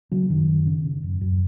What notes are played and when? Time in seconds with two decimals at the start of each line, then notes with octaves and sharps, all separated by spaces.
0.11 C#3 F#3
0.30 F#2 D#3
0.48 F#2
0.67 C#3
0.85 C#3
1.03 F#2
1.21 F#2